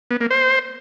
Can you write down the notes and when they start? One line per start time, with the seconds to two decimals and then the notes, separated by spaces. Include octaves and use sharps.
0.11 B3
0.21 A#3
0.31 C5